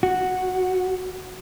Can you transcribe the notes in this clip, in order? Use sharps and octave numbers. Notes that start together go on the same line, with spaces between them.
F#4